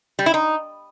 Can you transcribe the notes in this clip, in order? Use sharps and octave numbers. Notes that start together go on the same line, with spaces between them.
G3
E4
D#4